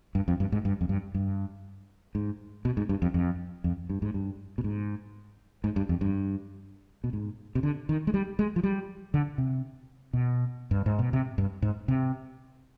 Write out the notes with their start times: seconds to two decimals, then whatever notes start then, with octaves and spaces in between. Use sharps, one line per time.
0.15 G2
0.28 F2
0.40 G2
0.52 G#2
0.65 G2
0.81 F2
0.89 G2
1.14 G2
2.15 G#2
2.65 B2
2.77 G#2
2.89 G2
3.02 F2
3.14 F2
3.64 F2
3.89 G2
4.02 G#2
4.14 G2
4.58 B2
4.64 G#2
5.64 G#2
5.76 G2
5.89 F2
6.01 G2
7.04 B2
7.13 G#2
7.55 C3
7.63 D3
7.89 D#3
8.07 G#3
8.14 G3
8.39 G#3
8.56 F3
8.63 G3
9.14 D3
9.38 C3
10.13 B2
10.71 G2
10.86 G#2
10.99 B2
11.13 C3
11.38 G2
11.62 G#2
11.88 C3